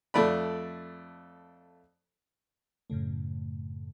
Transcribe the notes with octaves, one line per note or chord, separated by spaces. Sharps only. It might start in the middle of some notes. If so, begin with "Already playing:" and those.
F2 A3 D5 B5
F#2 A2 C#3 A3